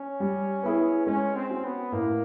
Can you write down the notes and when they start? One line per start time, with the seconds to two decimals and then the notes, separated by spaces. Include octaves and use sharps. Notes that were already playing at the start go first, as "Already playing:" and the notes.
Already playing: C#4
0.20 G3
0.63 B3 E4 G#4
1.06 G#3 C#4
1.35 C4
1.50 C#4 F#4
1.64 B3
1.92 A2 A#3